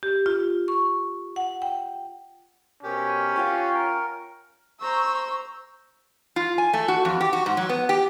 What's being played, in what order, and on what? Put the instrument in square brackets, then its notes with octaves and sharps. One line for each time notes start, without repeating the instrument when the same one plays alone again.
[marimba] G4
F4
C#6
F#5
G5
[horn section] B2 C4 A#4 [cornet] C#4 [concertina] G4
[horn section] F4 [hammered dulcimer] F#5 G5 C#6
[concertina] A#4
[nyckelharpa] C5 A#5 [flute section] C#6 [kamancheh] E6
[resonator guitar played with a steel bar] F4
G#5
A3
F#4
F2
G4
F#4
G#2
F#3
B3
G4